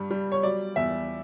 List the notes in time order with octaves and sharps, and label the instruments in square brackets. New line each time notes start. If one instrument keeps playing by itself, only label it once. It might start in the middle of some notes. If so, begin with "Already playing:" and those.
Already playing: [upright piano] G2 G3
G3
C#5
F#3 D5
E2 E5